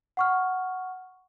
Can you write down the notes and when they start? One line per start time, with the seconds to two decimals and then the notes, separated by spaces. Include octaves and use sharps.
0.17 F#5 C#6 F6